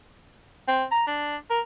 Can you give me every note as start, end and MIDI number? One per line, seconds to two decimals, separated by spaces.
0.68 0.84 60
0.92 1.06 82
1.07 1.36 62
1.50 1.60 70